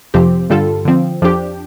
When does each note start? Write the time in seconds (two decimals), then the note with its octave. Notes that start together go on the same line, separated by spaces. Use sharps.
0.14 F2 C3 F3 C4 G4
0.50 G2 D3 G3 F4 A4
0.85 D3 F3 C4
1.22 F2 F3 D4 G4